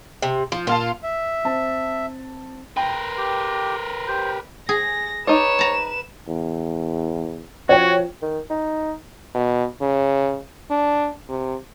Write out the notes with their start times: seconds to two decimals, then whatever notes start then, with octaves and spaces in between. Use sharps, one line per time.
0.22 C3
0.52 F3
0.67 A#2 F4 F5 A5
1.03 E5
1.45 C4 A5
2.77 A#4 B4 G5 A#5 C6
3.18 G4
4.08 G4 C5
4.69 G#4 A#6
5.27 D#4 B4 C#5 D5 E7
5.59 A5 A#5
6.28 E2
7.69 F3 F#4 C#5 G5
8.22 D#3
8.50 D#4
9.34 B2
9.81 C#3
10.71 D4
11.29 C3